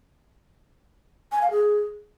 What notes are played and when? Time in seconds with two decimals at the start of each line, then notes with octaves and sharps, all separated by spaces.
1.32 G#5
1.41 F5
1.51 G#4